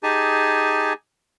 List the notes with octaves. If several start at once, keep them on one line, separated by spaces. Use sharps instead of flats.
D#4 G4 G#4 G#5 A5